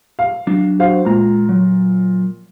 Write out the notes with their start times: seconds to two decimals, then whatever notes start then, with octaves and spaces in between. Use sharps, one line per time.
0.19 F5
0.47 F#3 D4
0.79 F#4 C5 F5
1.05 A#2 G#3 A#5
1.49 F#3